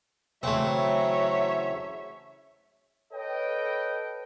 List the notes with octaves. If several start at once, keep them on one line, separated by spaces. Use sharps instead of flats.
C#3 E3 F#3 A3 C4 C#5 E5
A4 B4 C#5 D#5 G5